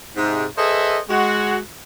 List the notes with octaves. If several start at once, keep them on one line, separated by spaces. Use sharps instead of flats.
G#2 C3 G#3
G#4 A4 B4 C5 D#5 E5
G#3 F#4